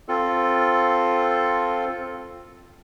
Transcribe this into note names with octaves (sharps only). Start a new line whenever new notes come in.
C4 F4 A4